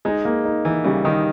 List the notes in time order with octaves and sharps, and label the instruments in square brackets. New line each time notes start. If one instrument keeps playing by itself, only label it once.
[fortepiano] G#3 [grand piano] D#4
[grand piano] A#3
D#4
[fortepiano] E3 [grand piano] D#4
[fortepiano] C#3 [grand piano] G3
[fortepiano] D#3 [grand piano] D#4